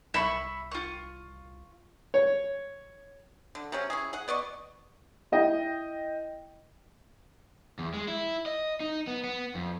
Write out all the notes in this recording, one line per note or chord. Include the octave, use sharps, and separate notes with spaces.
C2 E5 B5 C#6
F4 C#6
C#5
D3
C3 F#3 C#4
C#4 E4 G#4
G#4 F#5
B3 D5 D#5 C#6
E4 D#5 G5
E2
G#3
E4
D#5
D#4
B3
B3
F2